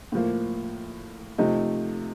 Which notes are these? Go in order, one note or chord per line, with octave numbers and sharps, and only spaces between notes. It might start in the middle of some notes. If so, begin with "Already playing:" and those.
A2 F3 A#3
C3 F3 A3 D#4